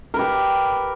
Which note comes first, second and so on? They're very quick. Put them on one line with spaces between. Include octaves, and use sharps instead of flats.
A#4 B4 G4